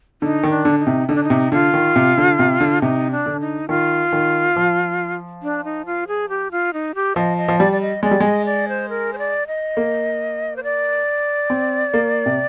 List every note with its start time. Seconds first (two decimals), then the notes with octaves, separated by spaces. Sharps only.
0.22 D3 D#4
0.43 D#3
0.50 D4
0.65 D3
0.79 D#4
0.87 C3
1.09 D3 D#4
1.16 D4
1.24 D#4
1.30 C3
1.52 D3 F4
1.74 D#3
1.96 C3
2.18 D3
2.39 C3
2.60 D3
2.82 C3 D#4
3.11 D4
3.26 D3
3.41 D#4
3.69 D#3 F4
4.13 D#3
4.56 F3
5.43 D4
5.64 D#4
5.86 F4
6.08 G#4
6.29 G4
6.52 F4
6.73 D#4
6.95 G4
7.16 F3 D#5
7.37 D#5
7.48 F3
7.59 G3 D5
7.72 D5
7.81 D#5
8.03 G#3 D5
8.11 G3
8.20 G#3 D#5
8.46 D5
8.69 C5
8.89 A#4
9.13 C5
9.18 D5
9.47 D#5
9.77 A#3
10.56 C5
10.64 D5
11.50 C4
11.94 A#3
12.26 C3